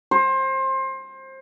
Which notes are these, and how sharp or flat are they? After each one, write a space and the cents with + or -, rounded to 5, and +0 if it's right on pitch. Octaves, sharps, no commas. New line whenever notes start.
C5 +25